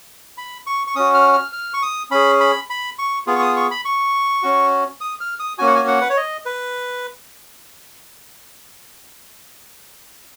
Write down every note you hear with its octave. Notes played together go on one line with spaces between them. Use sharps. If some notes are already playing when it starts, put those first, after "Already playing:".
B5
C#6
C#6
C#4 F#4 D#6
F6
F6
F6
C#6
D#6
C#4 G#4 B5
B5
B5
C#6
B3 F4 G#4
C#6
D#6
C#6
B5
C#6
C#4 F#4
D#6
F6
D#6
A#3 C#4 F#4 G#5
F#5
G#5
F#5
B4
C#5
D#5
B4